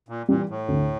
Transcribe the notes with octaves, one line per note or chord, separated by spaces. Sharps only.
A#2
A#2 E3 G3
A2
D2